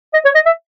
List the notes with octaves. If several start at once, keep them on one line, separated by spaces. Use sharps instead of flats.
D#5
C#5
D#5
E5